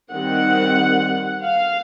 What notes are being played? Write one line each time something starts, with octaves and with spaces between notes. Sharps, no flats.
D#3 G3 C4 F#5
F5